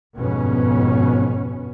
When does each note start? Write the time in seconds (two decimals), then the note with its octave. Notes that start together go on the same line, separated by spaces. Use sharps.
0.18 G1 F2 G#2 B2 B3 C#4